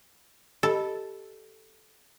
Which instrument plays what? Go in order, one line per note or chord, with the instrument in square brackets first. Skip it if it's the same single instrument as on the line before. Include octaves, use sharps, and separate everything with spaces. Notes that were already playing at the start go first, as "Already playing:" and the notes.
[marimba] G4 D#5 B5 [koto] A4